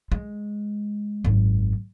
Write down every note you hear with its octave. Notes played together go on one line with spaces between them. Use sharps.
G#3
G#1 F#2